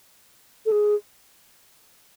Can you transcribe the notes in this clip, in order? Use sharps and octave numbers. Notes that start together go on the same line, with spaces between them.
A4
G#4